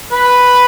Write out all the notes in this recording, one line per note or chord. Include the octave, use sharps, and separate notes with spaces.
B4